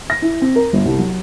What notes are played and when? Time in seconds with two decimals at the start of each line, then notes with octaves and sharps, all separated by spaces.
0.10 A#6
0.22 E4
0.42 C4
0.56 A#4
0.73 G1
0.85 C2
0.99 F#3